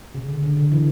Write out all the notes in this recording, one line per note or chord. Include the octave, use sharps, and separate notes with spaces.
C#3
D3
D3
D3
E3